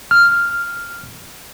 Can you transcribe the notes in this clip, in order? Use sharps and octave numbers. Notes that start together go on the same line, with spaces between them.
F6